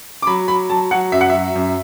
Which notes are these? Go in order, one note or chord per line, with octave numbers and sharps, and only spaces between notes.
D6
F#3 B5
F#3 B5
F#3 A5
F#3 F#5
F#2 E5
F#5
E5
F#3
F#2